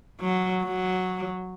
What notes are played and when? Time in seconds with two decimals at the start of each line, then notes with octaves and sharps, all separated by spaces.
0.20 F#3
0.63 F#3